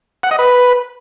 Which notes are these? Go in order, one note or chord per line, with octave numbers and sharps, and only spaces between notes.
F#5
D#5
B4